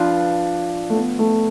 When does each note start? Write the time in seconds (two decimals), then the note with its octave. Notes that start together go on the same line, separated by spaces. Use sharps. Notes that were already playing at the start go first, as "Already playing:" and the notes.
Already playing: F3 D4 F4 B4
0.90 A3
0.95 B3
1.19 A3